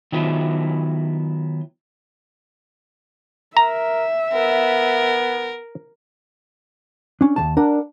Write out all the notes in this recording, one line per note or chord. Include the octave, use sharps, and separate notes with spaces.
D#3 F#3 B3 E4 F4
A#4 E5 A#5
B3 A#4
C#4 D4
D#2 F#3 A5
D4 A#4 F#5